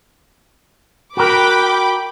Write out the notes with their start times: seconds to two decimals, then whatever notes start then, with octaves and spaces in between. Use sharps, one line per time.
1.17 F#4 A#4 G5 B5 D6